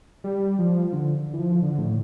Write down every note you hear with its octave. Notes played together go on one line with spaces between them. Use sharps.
G3
F3
D3
E3
F3
D3
A2